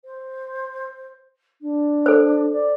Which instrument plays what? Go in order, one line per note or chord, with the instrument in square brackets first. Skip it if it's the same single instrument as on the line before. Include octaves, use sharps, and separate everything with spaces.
[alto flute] C5
D4
[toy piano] A4 C5
[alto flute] D5